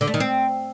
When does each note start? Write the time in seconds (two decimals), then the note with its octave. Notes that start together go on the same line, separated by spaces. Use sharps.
0.01 D3
0.07 A3
0.14 D#3
0.20 C4